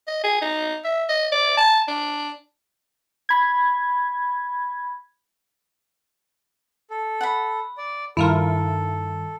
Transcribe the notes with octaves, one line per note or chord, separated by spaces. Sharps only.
D#5
G#4
D#4
E5
D#5
D5
A5
D4
B5 G#6
A4
F#5 B5
D5
G2 D#3 E4 F4 A4 A#4